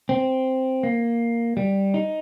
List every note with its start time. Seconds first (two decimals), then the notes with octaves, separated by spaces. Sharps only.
0.09 C4
0.83 A#3
1.57 G3
1.94 D#4